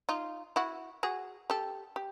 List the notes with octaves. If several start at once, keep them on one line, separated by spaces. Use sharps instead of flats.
D#4 F4
E4 F#4
F#4 G#4
G4 A4
G4